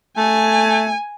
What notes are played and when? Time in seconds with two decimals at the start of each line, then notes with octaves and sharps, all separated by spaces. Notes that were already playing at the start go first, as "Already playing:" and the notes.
0.17 A3 G#5